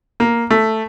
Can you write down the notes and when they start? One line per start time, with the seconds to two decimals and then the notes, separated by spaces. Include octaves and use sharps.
0.20 A#3
0.51 A3